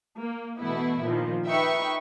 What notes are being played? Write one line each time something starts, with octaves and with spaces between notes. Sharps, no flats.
A#3
B2 E3 A3 B3 E4
A#2 D#3 F3
D#4 B4 E5 G5 C#6